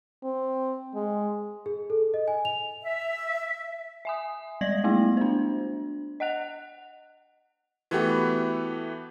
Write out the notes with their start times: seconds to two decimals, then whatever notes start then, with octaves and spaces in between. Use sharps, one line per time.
0.24 C4
0.95 G#3
1.66 G#4
1.90 A4
2.14 D#5
2.28 G#5
2.45 F7
2.82 E5
4.05 E5 G#5 D#6
4.61 G3 G#3 D5 G#6 A#6 F#7
4.84 A3 B3 E4
5.17 D4 C5
6.20 D#5 F#5 F#6 F7
7.91 E3 A3 B3 F#4 G4